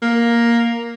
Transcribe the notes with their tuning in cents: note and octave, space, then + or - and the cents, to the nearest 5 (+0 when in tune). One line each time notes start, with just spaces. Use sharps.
A#3 +5